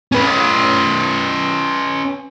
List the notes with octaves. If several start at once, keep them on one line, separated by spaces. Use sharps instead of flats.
C#4 B4